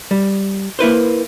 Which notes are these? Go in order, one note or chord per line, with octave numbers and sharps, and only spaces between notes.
G3
A#3 E4 B4 C5